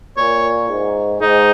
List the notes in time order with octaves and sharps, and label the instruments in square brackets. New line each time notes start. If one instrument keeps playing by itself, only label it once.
[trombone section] A#2 [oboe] C#5
[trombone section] G#2
[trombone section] G#2 [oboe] D#4